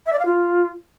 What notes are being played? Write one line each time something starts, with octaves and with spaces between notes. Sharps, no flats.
E5
D5
F5
F4